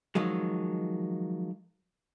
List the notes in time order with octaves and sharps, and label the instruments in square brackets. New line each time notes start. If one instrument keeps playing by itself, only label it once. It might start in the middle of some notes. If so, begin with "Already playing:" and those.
[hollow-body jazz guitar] D#3 F3 F#3 G#3